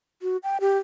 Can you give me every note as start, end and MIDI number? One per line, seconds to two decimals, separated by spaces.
0.22 0.37 66
0.43 0.57 79
0.60 0.78 67